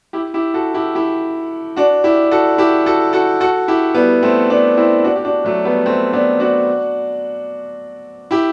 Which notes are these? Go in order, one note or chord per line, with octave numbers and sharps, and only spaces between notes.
E4 G4
E4 G4
F#4 A4
E4 G4
E4 G4
D4 F#4
E4 G4
F#4 A4
E4 G4
F#4 A4
F#4 A4
F#4 A4
E4 G4
G3 B3
A3 C4
B3 D4
C4 E4
D4 F#4
G4
D4 F#4
F#3 A3
G3 B3
A3 C4
B3 D4
D4 F#4
E4 G4